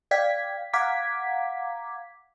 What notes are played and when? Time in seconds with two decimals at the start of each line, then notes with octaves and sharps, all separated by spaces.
0.11 D5 F5 G5 G#6 B6
0.73 F5 F#5 A#5 D6 G#6 B6